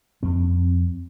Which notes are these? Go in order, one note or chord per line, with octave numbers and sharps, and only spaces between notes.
F2 C4